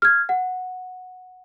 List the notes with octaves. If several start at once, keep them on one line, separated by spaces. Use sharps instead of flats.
F6 G#6
F#5